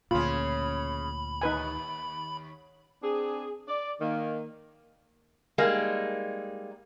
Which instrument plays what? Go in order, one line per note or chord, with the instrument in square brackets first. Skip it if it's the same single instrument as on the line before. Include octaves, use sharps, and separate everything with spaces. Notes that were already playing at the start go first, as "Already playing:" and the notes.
[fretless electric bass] D2 A#2 [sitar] C#3 C#4 [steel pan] F4 [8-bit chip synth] B5
[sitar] D#2 [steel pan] D#4 B4 G#5
[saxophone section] C4 D4 G#4
D5
D#3 A#3
[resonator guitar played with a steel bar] G3 G#3 A#3 D#4